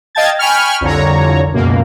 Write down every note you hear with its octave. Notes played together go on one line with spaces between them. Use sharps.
D#5 F5 G5 A5 G#6 A6
G5 G#5 B5 C#6 F6
C2 F2 D3 C#5 A#5
C#2 F#2 B2 A#3